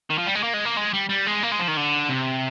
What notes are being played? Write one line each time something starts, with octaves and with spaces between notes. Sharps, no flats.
D#3
F3
G3
G#3
A#3
G#3
A#3
G#3
G3
G3
G#3
A#3
G#3
F3
D#3
D3
C3